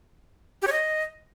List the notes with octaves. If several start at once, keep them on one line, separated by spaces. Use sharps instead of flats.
G4
C#5
D#5